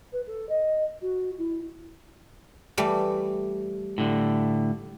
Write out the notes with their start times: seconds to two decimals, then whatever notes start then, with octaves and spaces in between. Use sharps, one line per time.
0.12 B4
0.26 A4
0.49 D#5
1.01 F#4
1.38 E4
2.77 E3 G3 A3
3.98 A2 D3